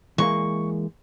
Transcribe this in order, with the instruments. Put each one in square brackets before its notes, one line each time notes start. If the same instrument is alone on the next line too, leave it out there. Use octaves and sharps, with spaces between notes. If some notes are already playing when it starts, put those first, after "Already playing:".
[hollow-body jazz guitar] E3 G#3 A#3 [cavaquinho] C#6